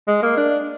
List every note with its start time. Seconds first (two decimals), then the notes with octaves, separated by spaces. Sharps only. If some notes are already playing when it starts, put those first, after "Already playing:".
0.08 G#3
0.22 A#3
0.37 D4